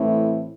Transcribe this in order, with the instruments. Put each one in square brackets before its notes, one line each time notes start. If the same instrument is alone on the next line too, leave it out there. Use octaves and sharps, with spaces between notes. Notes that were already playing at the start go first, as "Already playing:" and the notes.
Already playing: [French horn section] A2 E3 A3 C4